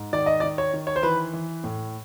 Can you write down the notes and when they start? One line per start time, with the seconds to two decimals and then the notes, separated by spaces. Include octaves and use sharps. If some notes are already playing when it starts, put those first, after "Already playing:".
Already playing: G#2
0.13 D#3 D5
0.26 D#5
0.40 D5
0.43 D#3
0.58 C#5
0.73 D#3
0.87 C#5
0.96 C5
1.03 E3 B4
1.33 E3
1.64 A2